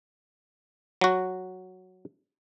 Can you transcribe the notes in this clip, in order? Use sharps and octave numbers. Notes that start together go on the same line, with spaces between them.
F#3 F#4